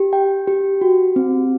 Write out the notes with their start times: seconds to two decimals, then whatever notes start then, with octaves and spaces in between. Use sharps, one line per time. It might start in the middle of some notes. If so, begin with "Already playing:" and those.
Already playing: G4
0.13 G5
0.48 G4
0.81 F#4
1.16 C4